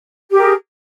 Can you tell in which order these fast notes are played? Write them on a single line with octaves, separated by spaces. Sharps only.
G4 A#4 G#4